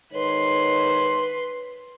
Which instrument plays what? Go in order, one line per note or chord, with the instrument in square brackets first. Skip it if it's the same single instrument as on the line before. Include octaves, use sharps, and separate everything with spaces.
[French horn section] G#2 D#3 C#5 [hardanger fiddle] B4 C6